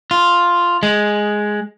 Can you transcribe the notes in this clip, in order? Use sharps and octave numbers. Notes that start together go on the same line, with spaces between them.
F4
G#3